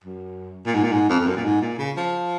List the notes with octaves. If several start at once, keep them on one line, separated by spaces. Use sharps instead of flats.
F#2
A#2
G#2
A#2
G#2
F2
F2
F#2
A#2
G#2
A#2
C#3
F3